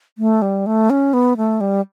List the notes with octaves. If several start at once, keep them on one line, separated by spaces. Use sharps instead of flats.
A3
G3
A3
C#4
B3
A3
G3